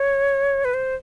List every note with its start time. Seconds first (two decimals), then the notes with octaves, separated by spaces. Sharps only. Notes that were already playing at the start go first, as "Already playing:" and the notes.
Already playing: C#5
0.65 B4
0.74 C5